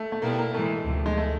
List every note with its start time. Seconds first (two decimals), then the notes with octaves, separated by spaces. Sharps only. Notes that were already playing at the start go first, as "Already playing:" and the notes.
Already playing: A3
0.12 A3
0.22 B2 G3 A#3 B3 E4 G4
0.38 A#3
0.54 A2 E3 G#3 A3
0.85 D2 C3 F3
1.06 G#3
1.17 A3